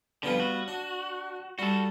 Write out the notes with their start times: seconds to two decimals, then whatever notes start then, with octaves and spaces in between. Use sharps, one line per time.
0.23 F2 D3 G3 B3 F4
0.40 F#4
0.68 D4
1.59 G3 F#4 A4